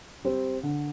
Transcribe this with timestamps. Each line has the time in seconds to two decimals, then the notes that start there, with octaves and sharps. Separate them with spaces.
0.25 G3 C4
0.63 D3